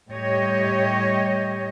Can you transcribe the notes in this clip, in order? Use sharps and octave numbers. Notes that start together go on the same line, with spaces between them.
A2 G3 G4 C#5 D#5